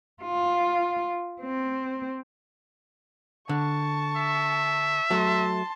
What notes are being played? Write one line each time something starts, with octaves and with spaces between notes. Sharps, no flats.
F4
C4
D3 A5 C#6
E5
F#3 A3 A5 C6